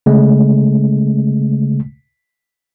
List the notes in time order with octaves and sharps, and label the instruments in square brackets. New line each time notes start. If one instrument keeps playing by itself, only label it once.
[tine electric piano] C#3 G#3 A3